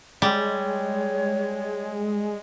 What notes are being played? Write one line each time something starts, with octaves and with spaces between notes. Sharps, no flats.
G3 G#3 C#5